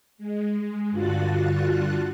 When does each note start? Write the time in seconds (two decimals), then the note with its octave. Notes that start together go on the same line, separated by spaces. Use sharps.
0.18 G#3
0.90 G2 D3 F4 F#4 F#6 A6